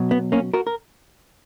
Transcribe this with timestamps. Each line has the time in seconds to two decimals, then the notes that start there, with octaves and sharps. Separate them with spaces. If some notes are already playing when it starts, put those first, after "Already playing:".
Already playing: B2 F#3
0.11 B3
0.32 A#3 C#4
0.54 F#4 A#4
0.67 A#4